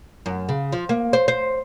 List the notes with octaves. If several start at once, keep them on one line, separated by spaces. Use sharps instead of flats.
F#2
C#3
F3
A#3
C5
C5